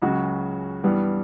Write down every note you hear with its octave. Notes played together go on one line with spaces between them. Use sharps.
C#2 C#3 F#3 C#4 F#4
G2 E3 G3 B3